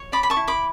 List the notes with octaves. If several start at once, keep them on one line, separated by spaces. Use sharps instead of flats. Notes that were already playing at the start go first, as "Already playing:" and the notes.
Already playing: C#5
D5 B5 D6
B5
A5 C#6
E4
B5 D6